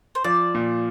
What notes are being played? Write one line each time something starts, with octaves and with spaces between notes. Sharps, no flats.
C5
F3 D5
A#2